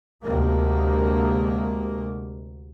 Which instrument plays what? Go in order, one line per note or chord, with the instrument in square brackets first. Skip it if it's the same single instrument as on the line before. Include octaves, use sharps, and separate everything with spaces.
[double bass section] D2 C3 G#3 A#3